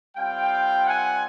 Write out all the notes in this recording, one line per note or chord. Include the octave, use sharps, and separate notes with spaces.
G3 C4 F4 F5 G5
F#5 G#5